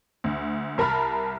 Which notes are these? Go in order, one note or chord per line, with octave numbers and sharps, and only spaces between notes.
D2
C2 A#4 A5 B5 F6